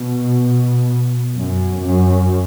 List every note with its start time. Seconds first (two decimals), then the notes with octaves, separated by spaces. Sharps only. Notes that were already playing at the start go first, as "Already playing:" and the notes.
Already playing: B2
1.36 F#2
1.82 F#2